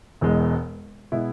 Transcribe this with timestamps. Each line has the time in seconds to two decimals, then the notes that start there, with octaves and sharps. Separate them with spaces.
0.21 E1 E2 B2 G#3
1.12 B2 G#3 B3 E4